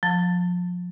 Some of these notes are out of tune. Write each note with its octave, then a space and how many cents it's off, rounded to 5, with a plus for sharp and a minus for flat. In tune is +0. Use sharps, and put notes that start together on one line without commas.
F3 +30 A5 +25